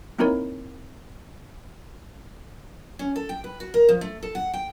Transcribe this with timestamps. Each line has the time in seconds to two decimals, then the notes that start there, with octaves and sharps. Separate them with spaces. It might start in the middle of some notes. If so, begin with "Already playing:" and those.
0.18 A#3 C4 D#4 E4 A#4 C#5
2.99 C#4
3.16 A4
3.29 G5
3.44 B4
3.60 F#4
3.74 A#4
3.89 F3
4.01 A3
4.23 A4
4.35 F#5
4.54 G5